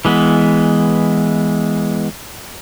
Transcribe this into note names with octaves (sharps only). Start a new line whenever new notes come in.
E3 G#3 B3